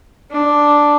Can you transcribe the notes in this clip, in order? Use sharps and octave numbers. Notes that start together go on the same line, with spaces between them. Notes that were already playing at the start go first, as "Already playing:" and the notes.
D4